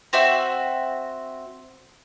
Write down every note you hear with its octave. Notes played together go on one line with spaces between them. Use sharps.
C4 F#4 E5 G5